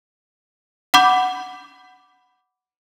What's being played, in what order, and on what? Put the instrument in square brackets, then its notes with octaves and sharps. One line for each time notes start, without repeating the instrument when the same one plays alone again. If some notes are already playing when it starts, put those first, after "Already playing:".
[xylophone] F#5 B5 D6 G6